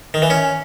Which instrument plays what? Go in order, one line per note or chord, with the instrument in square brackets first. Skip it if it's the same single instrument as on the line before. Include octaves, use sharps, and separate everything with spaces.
[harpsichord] D#3
E3
C#4